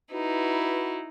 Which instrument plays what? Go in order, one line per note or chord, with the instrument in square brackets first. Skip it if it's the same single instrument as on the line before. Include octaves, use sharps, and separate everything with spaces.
[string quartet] D#4 E4 [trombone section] F#4 B4